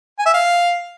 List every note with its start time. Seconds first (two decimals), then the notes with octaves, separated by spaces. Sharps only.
0.19 G#5
0.26 E5
0.34 F5